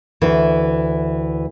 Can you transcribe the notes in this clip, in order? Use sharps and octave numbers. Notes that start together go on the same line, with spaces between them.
D2 E3